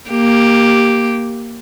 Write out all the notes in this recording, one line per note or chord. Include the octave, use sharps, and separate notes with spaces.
A#3 G4